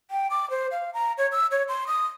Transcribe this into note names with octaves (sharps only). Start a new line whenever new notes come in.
G5
D6
C5
F5
A#5
C#5
E6
C#5
C6
D#6